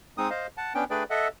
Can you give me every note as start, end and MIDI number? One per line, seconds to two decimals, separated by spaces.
0.18 0.30 56
0.18 0.30 60
0.18 0.30 63
0.18 0.30 87
0.30 0.47 72
0.30 0.47 75
0.30 0.47 77
0.57 0.73 78
0.57 0.73 81
0.75 0.84 59
0.75 0.84 61
0.75 0.84 62
0.75 0.84 79
0.90 1.04 57
0.90 1.04 62
0.90 1.04 68
0.90 1.04 71
0.90 1.04 74
0.90 1.04 79
1.10 1.28 69
1.10 1.28 75
1.10 1.28 76
1.10 1.28 78